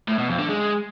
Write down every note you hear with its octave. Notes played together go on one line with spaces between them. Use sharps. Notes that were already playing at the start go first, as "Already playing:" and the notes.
A2
B2
F2
D3
G#3